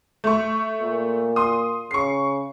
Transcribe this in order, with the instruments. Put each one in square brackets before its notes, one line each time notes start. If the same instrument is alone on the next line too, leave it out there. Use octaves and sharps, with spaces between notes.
[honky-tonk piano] A3 C#6
[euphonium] A#2
[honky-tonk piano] C6 D#6
[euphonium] C#3 [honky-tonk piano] C#6 C7